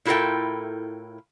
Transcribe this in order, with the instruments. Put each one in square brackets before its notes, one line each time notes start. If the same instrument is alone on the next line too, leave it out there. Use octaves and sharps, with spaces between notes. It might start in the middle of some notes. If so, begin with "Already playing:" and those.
[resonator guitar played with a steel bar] A2 E4 F4 A4 A#4 G5